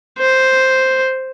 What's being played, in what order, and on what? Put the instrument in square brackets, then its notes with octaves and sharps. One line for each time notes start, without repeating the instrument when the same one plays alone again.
[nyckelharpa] C5